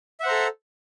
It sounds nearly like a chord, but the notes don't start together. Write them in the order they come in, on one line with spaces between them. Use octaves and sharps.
E5 F#5 C5 A#5 A4